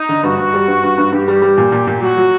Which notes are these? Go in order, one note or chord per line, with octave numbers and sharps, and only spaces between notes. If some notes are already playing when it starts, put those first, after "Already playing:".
Already playing: D#4
D3
G2 F#4
G2
G3
G2
G2
G2
G2 G4
G3
G3
A#2
A#2
A#2
F#3 F#4
F#3